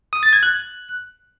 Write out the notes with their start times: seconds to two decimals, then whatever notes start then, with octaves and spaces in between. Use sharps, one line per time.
0.13 D#6
0.23 A6
0.33 G#6
0.43 F#6